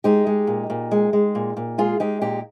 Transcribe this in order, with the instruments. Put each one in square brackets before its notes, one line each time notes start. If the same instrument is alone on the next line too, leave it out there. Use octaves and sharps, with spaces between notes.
[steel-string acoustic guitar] G#3 D#4 G4
G#3
A#2
A#2
G#3
G#3
A#2
A#2
G#3 F4 G#4
G#3 D#4 G4
A#2 D#4 G4